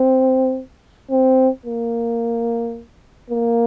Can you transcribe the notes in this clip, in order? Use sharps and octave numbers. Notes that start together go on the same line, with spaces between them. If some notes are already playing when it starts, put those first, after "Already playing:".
Already playing: C4
C4
A#3
A#3